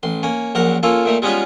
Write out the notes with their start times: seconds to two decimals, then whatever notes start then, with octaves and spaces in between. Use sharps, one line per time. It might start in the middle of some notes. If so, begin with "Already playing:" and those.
0.03 A1 C6
0.23 A#3 C#4
0.55 A#1 F#2 A#4 F#5
0.83 A#3 C#4 F4 A4
1.05 A#2 A3 D#4
1.22 G3 G#3 B3 C#4 D#4 F4